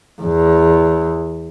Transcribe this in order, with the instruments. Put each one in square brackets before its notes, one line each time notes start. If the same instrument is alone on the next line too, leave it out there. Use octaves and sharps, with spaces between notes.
[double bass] E2